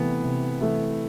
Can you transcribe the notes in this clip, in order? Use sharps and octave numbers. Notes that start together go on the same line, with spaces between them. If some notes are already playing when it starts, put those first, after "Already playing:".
Already playing: C3 E3 A3 B3 E4
C3
E3 A3 E4